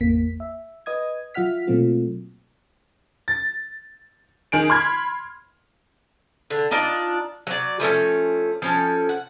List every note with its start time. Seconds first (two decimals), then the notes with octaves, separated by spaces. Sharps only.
0.01 G#1 E2 A#3 B6
0.40 E5
0.86 B4 D#5 D#6 G#6
1.34 F#3 F4 E5 F#5 F6 B6
1.67 B2 F#3 A3 A#3 C4 F4
3.28 A6
4.52 D#3 G#4 D7
4.70 B5 C6 F6 G#6
6.50 D3
6.71 D4 D#4 F4 D5
7.47 F#3 D5
7.80 F3 A3 B3 C#4
8.62 F3 C#4 A4
9.09 F#5